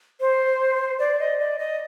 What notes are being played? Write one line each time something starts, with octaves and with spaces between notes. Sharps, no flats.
C5
D5
D#5
D5
D#5